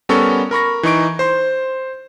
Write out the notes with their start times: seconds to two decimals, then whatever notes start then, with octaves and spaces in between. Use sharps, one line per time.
0.09 G3 B3 C#4 A4 A#4 C#6
0.51 A#4 B5 C#6 A#6
0.83 E3 D#4 C#6 D7
1.19 C5 C6